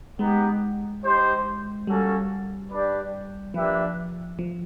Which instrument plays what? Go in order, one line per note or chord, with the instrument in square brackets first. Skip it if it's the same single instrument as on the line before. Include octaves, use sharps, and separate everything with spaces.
[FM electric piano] G#3 [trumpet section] B3 D#4 G4
[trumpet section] D#4 G4 C5
[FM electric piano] G3 [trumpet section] A#3 C#4 F#4 A4
[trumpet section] D4 G4 B4 D5
[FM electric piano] F3 [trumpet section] A#3 D4 G4 B4 E5
[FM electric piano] F3